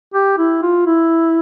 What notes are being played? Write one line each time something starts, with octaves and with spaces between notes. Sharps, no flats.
G4
E4
F4
E4